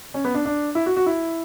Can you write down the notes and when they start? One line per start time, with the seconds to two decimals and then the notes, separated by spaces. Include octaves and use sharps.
0.14 C#4
0.25 B3
0.34 D4
0.45 D4
0.75 E4
0.86 F#4
0.96 F#4
1.06 E4